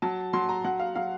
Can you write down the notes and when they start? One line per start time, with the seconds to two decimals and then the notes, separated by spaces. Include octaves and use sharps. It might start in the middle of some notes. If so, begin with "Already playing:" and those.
0.02 F#3 A5
0.33 F#3 C6
0.49 A#5
0.64 F#3 F#5
0.80 F5
0.95 F#3 F5